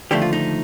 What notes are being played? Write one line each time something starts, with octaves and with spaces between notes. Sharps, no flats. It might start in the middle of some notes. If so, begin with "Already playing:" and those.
D#2 D3 F3 A3 G4
F4
D#4